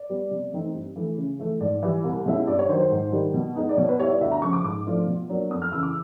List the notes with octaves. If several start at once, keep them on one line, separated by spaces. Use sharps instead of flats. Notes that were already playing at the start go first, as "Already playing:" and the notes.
Already playing: D5
G3 B3
C3
E3 A3 C4 D#4
G2
E3 A3
C#3
E3 A3
G#2 D5
E3 G3
C2
B2 G#3 C#4 E4
G2 D5
C#5
D#3 F#3 C5
C5
G#2
D#3 G3
B2
G#3 B3 D#4
D5
B2 C#5
B4
G3 B3 E4 C#5
D5
D2 E5
A#5
C#3 F3 C#6
D6
G#2 D6
F3 A3 D4 F4
B2
F#3 A#3 D4
F2 D#6
F6
C#3 E3 E6
D6